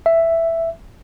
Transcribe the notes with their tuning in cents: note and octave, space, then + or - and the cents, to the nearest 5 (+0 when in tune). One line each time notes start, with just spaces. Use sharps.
E5 +5